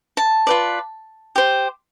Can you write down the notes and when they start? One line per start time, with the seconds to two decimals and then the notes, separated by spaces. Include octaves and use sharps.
0.17 A5
0.47 F4 B4 D5
1.36 G4 C5